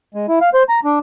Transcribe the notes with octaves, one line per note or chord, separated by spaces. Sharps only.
G#3
E4
F5
C5
A#5
D4